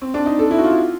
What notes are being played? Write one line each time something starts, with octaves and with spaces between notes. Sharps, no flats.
C4
D4
D#4
A4
E4
F#4
F4